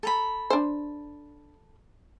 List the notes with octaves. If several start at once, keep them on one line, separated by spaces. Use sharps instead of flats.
A4 A#5 B5
D4 C5